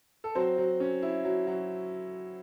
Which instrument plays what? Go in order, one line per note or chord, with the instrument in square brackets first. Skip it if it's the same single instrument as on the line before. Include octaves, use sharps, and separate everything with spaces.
[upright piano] A4
F#3 C4 C5
F#3
C#4
E4
F#3
F#3